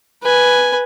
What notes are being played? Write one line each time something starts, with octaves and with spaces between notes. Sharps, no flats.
B4 G#5